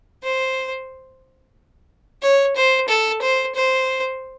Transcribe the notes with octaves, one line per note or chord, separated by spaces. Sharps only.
C5
C#5
C5
A4
C5
C5